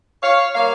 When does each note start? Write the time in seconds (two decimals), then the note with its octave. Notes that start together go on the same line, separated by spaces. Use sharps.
0.23 C#5 F5
0.54 G3 A#3 C#5 F5